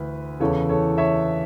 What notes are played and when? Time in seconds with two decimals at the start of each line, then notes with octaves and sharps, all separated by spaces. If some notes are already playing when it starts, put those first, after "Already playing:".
Already playing: D2 E3 B4
0.40 E2 C#3 E3 A4 C#5
0.69 A4 C#5
0.98 C#5 E5